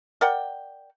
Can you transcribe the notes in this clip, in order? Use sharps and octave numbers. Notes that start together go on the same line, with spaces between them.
A#4 D5 F#5 G5